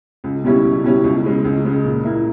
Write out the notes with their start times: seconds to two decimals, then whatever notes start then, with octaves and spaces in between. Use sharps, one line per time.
0.24 C#2
0.44 B2 G3 C#4 E4
0.64 C#2
0.83 B2 G3 C#4 E4
1.04 C#2
1.24 C#3 G#3
1.44 C#2
1.65 C#3 G#3
1.85 A#2
2.05 A#3 E4